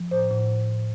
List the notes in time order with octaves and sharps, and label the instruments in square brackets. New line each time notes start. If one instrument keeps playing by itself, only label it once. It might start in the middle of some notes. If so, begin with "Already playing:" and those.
Already playing: [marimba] F3
A2 C5
A2